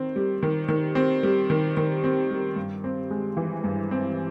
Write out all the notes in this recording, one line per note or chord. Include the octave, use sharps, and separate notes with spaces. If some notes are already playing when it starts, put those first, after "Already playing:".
Already playing: D#3 C4
G3
D#3
D#3
C4
G3
D#3
D#3
C4
G3
G2
C4
G#3
E3
G2
C4